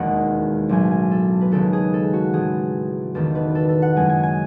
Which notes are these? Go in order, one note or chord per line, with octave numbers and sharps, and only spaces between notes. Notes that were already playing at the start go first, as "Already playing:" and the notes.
Already playing: E1 D#2 D#3 G#3 F#5
B1 A2 F#3 A3 G#5
G#5
A4
B4
D#2 C#3 G#3 A4
G#4
A4
F#4
A1 A2 E3 G#4
E1 E2 D#3 A3 A4
B4
A4
A4
F#5
F#2 C#3 G#3 G#5
G#5
G#5